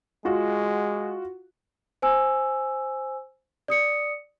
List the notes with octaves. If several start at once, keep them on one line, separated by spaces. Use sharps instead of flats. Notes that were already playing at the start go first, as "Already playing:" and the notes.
G#3 F4 F#4
C5 G#5 E6
D5 D#6 C#7